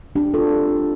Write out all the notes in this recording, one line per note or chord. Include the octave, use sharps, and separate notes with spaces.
C4 D4 G4
C4 F4 A4